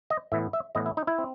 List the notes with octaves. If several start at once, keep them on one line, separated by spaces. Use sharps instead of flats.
D#5
A2 E3 B3 E5
E5
A2 E3 B3 D#5
E4
D#4
E4
C4